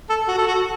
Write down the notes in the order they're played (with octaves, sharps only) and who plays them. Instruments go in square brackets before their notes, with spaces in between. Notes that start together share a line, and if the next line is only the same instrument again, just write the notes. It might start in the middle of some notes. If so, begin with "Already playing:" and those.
[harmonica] A4
F#4
A4
F#4